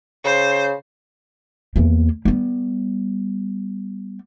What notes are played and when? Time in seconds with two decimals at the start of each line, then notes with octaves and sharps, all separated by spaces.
0.25 C#3 C5
1.76 E2 A#3
2.25 G3 B3